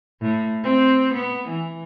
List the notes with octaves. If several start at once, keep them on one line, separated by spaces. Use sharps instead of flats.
A2
C4
B3
E3